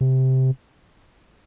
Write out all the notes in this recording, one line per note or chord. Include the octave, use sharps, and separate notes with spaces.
C3